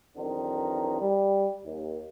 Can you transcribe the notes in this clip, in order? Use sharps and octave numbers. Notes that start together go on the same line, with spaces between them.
B1 E2 D#3 C4 D4
G3
D#2